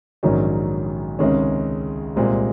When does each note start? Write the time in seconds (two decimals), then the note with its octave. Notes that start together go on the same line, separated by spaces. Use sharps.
0.23 A#1 G#2 D#3 F#3 C#4
1.19 C#2 C3 D#3 G#3 C#4
2.16 C2 A#2 G#3 C4